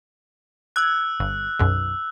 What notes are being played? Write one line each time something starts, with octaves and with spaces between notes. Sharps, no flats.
E6 F#6 G#6
G1
B1 F#2